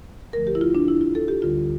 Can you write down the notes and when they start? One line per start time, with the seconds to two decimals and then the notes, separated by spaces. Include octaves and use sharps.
0.33 D2 D3 F3 A3 A#4
0.47 G4
0.55 E4
0.61 F4
0.75 D4
0.88 E4
1.01 F4
1.15 A4
1.28 G4
1.42 D2 D3 G3 F4